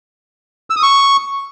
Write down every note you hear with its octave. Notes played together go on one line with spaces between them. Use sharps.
E6
D#6
C#6